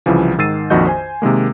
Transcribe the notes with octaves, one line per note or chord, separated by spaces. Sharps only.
C2 C#3 E3 F3
G#2 D#3 E6 A6 C7 D#7
A#1 F2 D#3 F#4 D#5 G6
C5 G#5
C3 D#3 G#3 A#3